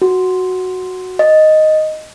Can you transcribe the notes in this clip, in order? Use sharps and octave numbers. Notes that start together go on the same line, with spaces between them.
F#4
D#5